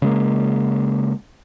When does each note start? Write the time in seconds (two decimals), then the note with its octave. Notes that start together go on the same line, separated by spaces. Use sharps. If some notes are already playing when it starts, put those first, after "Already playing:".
0.02 C#3 G#3 A#3